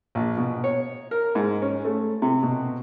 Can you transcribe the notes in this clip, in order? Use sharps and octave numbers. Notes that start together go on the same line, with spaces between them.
A#1
B2
C#5
A#4
G#2
C#4
A3
C3
B2